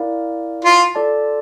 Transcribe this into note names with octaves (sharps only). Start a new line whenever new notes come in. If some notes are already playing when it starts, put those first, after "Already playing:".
Already playing: E4 A#4 D5 F5
F4
F4 A4 D5 A5